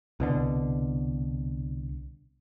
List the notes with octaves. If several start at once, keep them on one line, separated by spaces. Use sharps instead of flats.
C2 B2 D3